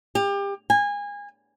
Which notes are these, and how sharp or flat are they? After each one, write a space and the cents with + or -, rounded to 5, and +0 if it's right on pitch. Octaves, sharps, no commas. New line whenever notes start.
G4 +30
G#5 -25